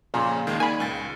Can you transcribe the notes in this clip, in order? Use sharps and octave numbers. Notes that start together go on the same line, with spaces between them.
F2 A#2 C#3 C#4
D#2 D#3 G#3
D#3 D5 G#5 B5
C#2 A6